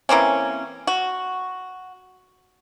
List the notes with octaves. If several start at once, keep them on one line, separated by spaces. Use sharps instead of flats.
E3 A#3 C4 C#4
F#4